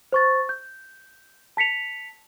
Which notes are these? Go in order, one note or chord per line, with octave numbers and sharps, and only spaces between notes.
C5 C#6 A6
G6
A5 B6 C#7 F7